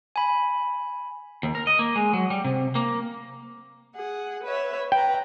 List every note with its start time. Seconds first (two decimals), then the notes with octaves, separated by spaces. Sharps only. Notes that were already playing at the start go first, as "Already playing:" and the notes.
0.16 G#5 B5
1.43 D#2
1.55 A#4
1.67 D#5
1.79 A#3
1.96 G#3
2.13 F#3
2.30 G3
2.44 C3
2.75 A#3
3.94 G#4 F#5
4.42 B4 C#5 E5
4.92 B4 G5 A#5